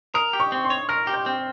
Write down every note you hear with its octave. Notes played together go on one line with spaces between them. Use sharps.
A#4 D#6
G4
C#6
C4
C6
C#5
A#4 F6
G4
G6
C4